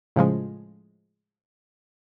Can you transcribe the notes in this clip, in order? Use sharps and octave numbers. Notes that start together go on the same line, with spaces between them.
A2 C#3 F3 G#3